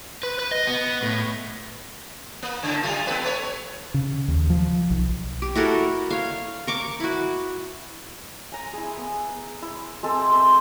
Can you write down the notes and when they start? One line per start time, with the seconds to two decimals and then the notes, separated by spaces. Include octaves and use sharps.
0.23 B4
0.39 B4
0.51 D#5
0.67 B3
1.03 A2
2.43 A#3
2.63 A2 C#3
2.83 G3 A3 F4
3.07 B3 A4 B4
3.23 A3 C#5
3.94 C#3
4.28 D#2
4.50 F3
4.90 B1
5.42 G4
5.55 E4 F#4 A4 A#4
6.10 C#5 F5
6.67 A#4 C#6 D6
7.00 E4 F#4
8.52 G#5 A#5
8.73 E4 G#4
8.97 B3
9.62 E4
10.03 G#3 C4 A4
10.32 C5 E5